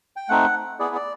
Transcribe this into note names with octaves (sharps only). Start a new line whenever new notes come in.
G5
A3 C4 D#4 F#5
B3 E4 G#4 D5
D5